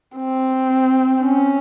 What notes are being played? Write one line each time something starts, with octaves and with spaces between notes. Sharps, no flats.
C4
C#4